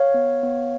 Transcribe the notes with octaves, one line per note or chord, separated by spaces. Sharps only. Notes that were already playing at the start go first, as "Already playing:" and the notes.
Already playing: C#5 F5
B3
B3